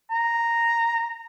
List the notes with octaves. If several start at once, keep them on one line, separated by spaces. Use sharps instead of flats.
A#5